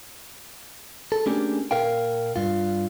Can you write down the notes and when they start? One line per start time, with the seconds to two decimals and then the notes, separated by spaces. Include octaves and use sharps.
1.12 A4
1.26 A3 A#3 C#4 D4 G4 G#4
1.71 A#2 A#4 F5 G5
2.36 G2 F4